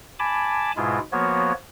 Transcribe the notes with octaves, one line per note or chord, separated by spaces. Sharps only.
G#5 A5 B5 D6
G#2 B2 G#3 E4 F4
F3 A#3 B3 F#4 C#5